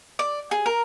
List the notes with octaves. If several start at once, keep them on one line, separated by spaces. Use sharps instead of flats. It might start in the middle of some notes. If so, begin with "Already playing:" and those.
D5
G#4
A#4